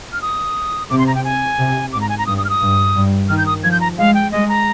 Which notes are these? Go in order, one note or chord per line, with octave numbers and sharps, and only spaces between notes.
F6
D#6
C3 D6
C6
A#5
G5
G#5
C3
G#2 D6
A#5
G#5
A#5
G2 D#6
D#6
F6
D#6
G2
G2
D#3 F6
G6
D#6
F3 G#6
G6
A#5
G#3 F5
G5
G#3 D#5
A#5